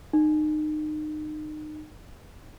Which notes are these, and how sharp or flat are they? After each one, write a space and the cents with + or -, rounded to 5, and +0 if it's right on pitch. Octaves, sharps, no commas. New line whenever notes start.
D#4 -30